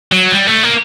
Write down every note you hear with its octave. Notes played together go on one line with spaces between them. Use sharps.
F#3
G3
A3
A#3